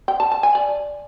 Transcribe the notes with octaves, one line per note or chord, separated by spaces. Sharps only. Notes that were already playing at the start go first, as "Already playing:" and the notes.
G5
A5
A5
G#5
D5